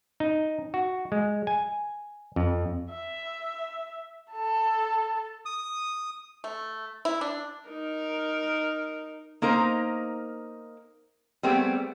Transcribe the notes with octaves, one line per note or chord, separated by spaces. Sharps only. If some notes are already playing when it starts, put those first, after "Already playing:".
D#4
F#4
G#3
G#5
F2
E5
A4 A5
D#6
A3
E4
D4
D#4 A#4
A#3 D#4 A#4 C5
G3 A3 B3 C4 G4 G#4